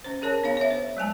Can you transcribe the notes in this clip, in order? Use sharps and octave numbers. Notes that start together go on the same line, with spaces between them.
C#4 C5
C#4 G#4 A#4 C#5 A5
B3 D4 C#5 F5
C#5 E5
C5
F#3 G#3 G#5 A5